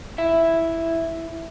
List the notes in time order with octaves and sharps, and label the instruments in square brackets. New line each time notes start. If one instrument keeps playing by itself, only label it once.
[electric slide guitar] E4 E5